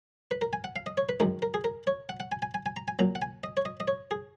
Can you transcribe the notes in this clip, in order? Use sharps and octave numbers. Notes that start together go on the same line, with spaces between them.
B4
A#4
G#5
F#5
F5
D#5
C#5
B4
F#2 D#3 G#3 A#4
A#4
G#4
A#4
C#5
F#5
F#5
G#5
G#5
G#5
G#5
A#5
G#5
A#2 F#3 A#5
F#5
G#5
D#5
C#5
D#5
D#5
C#5
G#4